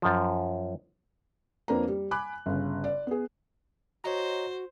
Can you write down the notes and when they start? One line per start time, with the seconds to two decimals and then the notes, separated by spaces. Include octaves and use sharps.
0.02 F#2 F3
1.68 F2 A#3 C4 D4 B4 A#5
1.88 G3
2.11 G#5 B5 D6 F#6
2.46 G1 C#3
2.84 D5
3.07 B3 G#4
4.04 F#4 C5 C#5 D#5 A#5